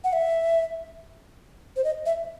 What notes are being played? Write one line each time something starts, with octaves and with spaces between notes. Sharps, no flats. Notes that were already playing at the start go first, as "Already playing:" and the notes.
F#5
E5
C5
D#5
E5